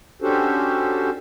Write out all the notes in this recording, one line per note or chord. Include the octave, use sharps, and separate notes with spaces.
C#4 D4 F#4 G4 A4 C5